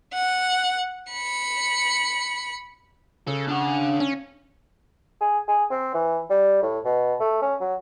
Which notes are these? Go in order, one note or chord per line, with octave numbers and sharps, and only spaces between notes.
F#5
B5 C#7
C#3 A4
D4 F#5
C#4
G#4
G#4
C4
E3
G3
A2
B2
A3
C#4
F#3